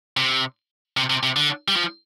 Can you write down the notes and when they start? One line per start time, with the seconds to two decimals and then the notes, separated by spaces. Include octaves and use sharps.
0.17 C3
0.97 C3
1.10 C3
1.23 C3
1.36 D3
1.68 G3
1.76 F3